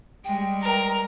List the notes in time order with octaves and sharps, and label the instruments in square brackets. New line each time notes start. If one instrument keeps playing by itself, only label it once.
[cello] G3 G#3 [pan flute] G5
[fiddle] A#4